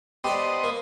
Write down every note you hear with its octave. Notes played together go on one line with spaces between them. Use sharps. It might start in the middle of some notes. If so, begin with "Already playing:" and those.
B3 G4 A4 C5 D5 D#5
A#3